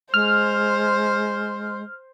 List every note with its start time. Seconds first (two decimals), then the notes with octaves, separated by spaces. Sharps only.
0.14 G#3 C5 F6